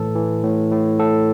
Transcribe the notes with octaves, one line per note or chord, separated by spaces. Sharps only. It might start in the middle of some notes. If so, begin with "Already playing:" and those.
Already playing: A2 E3 A4
E3
A2
A2
A2 A4